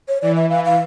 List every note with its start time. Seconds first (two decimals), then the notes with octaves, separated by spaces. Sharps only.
0.08 C#5
0.22 E3 D5
0.36 E5
0.50 E3 F5
0.65 F5